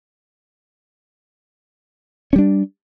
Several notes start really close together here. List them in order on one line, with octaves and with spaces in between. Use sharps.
C#4 G3 D4